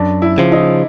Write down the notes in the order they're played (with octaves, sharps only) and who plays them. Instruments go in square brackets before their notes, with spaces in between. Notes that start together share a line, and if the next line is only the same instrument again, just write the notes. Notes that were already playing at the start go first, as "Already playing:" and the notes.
Already playing: [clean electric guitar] F#2 [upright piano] D4
[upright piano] E4
[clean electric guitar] C#3 F3
[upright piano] D#4